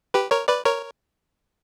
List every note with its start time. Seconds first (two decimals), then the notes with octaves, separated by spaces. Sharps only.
0.14 G4 B4
0.31 A#4 C#5
0.48 B4 D5
0.65 A#4 C#5